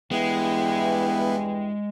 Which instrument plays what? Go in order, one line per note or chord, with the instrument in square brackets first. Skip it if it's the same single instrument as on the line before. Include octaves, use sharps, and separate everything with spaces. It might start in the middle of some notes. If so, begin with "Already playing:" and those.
[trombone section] E2 G2 E3 [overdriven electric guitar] G#3 [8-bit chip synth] B3 E4 [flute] G5